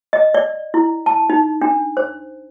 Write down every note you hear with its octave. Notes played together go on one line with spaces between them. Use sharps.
D#5
D5
E4
A5
D#4
D4
C5